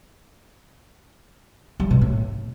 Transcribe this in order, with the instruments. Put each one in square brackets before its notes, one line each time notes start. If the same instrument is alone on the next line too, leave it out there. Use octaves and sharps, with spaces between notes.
[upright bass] G3
B2
A2